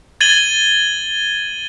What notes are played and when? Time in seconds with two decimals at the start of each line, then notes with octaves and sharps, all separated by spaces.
0.21 G#6 A6 D#7 F#7 G7